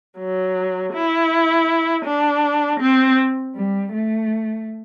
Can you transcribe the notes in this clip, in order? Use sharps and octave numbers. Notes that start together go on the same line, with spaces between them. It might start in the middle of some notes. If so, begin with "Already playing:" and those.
F#3
E4
D4
C4
G3
A3